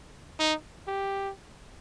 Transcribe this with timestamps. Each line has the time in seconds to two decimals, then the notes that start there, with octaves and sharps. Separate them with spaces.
0.40 D#4
0.87 G4